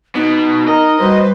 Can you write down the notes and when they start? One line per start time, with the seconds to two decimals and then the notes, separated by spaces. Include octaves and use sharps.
0.15 B2 D#4
0.68 A#4 D#5
1.00 G3 F#4 B4 C5